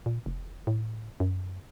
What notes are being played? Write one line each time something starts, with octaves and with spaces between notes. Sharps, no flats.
A#2
F1
A2
F#2